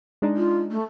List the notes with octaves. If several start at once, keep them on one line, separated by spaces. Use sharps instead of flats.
G#3 D4 D#4
F4
A3